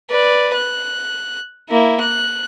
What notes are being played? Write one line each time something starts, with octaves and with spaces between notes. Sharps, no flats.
B4 D5
F#6
A#3 E4
F#6